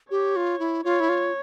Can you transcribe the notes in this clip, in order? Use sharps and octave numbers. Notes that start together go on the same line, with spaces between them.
G4 C#5
F4
E4
F4 C#5
E4
F4